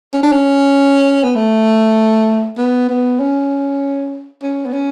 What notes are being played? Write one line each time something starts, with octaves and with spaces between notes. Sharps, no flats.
C#4
D4
C#4
B3
A3
B3
B3
C#4
C#4
B3
C#4